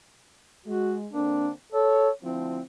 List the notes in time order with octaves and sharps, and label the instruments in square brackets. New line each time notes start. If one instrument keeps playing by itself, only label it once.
[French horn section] G#3 [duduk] F#4
[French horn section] D3 A#3 C4 [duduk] D4
[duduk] A4 [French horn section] C#5
[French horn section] D2 F3 E4 [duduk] C4